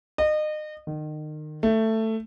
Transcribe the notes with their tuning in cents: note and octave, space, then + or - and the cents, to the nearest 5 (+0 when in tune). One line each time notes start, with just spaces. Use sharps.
D#5 -30
D#3 -30
A3 +10